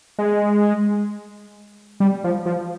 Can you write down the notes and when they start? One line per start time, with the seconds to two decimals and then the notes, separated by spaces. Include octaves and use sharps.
0.19 G#3
2.00 G3
2.24 F3
2.46 F3